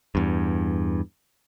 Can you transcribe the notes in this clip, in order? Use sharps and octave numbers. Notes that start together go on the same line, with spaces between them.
E2 G2